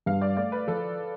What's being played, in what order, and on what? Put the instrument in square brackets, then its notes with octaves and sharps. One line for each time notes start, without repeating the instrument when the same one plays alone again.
[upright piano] G2 [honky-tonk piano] F5
[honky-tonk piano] D5
[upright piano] A3 [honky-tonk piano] D5
[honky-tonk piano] B4
[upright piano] F3 [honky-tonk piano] A4